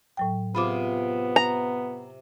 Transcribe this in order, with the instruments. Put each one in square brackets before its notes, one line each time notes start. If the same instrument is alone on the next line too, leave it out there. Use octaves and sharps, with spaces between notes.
[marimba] A2 F#3 G5
[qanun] C3 F4 G#4 [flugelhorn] B3 [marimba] B5 D6
[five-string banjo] A#5